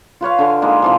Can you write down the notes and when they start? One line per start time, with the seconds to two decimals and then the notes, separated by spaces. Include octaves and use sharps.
0.21 F4 B4 C#5 F5
0.39 D3 G#5
0.62 G#3 A#3 D#4
0.82 C3 E3 F3